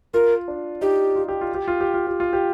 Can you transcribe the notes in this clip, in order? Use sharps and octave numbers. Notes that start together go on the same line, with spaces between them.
F4 A#4
D4
D#4 G4
F4
G4
F4
G4
F4
G4
F4
G4
F4
G4